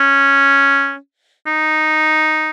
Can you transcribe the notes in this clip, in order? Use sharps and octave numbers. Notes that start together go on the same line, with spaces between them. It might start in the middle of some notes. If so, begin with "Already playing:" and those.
Already playing: C#4
D#4